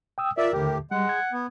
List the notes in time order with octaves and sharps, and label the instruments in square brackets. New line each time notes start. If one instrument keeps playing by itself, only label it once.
[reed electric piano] G5 D#6 E6
[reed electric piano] F4 [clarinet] A#4 [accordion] D5 E5
[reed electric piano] D#2 D3 [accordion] A2 G4
[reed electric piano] G3 [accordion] G#3 [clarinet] F#5
[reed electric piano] G#6
[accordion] B3